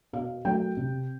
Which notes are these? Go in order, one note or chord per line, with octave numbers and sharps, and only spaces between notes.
B2 F5
F#3 A3 G5
C3